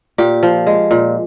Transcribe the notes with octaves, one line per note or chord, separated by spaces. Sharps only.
A#2 G4
F3
G#3
A#2